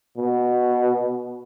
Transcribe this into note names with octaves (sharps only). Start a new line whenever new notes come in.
B2